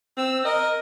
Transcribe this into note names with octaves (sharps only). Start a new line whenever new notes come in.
C4 E6
A#4 D#5